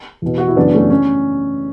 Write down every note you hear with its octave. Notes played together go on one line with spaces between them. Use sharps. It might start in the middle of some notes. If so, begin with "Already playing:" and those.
E2 B2
F#4
E4
F#2 C#3 E3 B3 D4
B3
A3 C#4
C#4